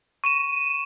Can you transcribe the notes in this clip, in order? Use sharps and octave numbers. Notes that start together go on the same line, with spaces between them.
C#6 D#7 E7